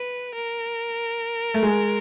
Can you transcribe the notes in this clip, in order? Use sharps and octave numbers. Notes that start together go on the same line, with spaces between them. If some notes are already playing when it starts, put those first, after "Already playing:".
Already playing: B4
A#4
A3
G#3